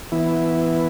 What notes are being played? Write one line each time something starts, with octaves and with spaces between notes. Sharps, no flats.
E3 B3 E4